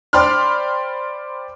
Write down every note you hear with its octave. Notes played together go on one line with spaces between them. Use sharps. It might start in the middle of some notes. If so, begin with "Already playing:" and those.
C5 D5 G5 B5 C6 F6